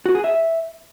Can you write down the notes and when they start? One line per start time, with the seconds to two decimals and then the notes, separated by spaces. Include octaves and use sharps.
0.06 F#4
0.15 G#4
0.24 E5